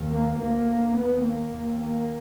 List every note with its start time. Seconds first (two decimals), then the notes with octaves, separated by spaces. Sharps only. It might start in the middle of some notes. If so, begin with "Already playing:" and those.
Already playing: D#2
0.11 A#3
0.40 D2 A#3
0.96 D#2 B3
1.24 A#3
1.53 D#2
1.81 A#3